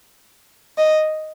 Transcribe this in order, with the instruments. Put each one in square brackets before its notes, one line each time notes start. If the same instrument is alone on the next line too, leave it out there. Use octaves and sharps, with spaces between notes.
[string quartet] D#5